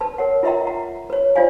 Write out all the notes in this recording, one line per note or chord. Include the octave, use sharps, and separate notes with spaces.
B4 A5
A#4 C#5 F#5
F4 B4 D#5 E5 G5 A#5
F#5 A#5
B4 C#5
F4 C5 D5 F5 G#5